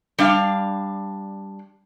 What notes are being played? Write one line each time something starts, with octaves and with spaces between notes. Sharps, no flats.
G3 D4 F5